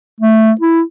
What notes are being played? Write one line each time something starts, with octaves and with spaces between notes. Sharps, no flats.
A3
E4